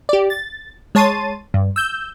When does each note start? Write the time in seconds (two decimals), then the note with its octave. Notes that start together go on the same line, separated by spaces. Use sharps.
0.09 G4 D5
0.30 A6
0.95 G#3 C#5 A5 C6 A6 D#7
1.54 G2
1.76 E6 G6